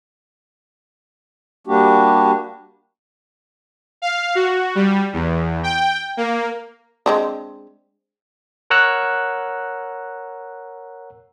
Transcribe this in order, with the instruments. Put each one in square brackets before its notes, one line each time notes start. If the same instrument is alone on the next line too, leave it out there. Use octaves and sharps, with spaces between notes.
[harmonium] G3 A#3 D4 F#4 G4
[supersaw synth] F5
F#4
G3
E2
G5
A#3
[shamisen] G#3 C4 D4
[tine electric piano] A#4 C#5 F#5 A#5 E6 F#6